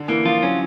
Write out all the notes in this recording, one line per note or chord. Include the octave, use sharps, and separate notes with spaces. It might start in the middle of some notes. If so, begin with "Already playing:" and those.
Already playing: D3
E3 A#3
F3 F4
F#3 C#4